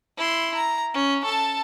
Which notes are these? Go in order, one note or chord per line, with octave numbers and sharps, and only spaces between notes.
E4 C6
A#5
C#4
A4 A5